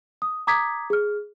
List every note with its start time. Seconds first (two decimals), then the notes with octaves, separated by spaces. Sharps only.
0.22 D#6
0.47 A#5 D6 D#6 G#6 B6
0.90 G#4 F6